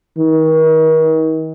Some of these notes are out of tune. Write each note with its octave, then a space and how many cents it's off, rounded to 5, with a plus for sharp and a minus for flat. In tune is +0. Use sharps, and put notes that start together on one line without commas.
D#3 +35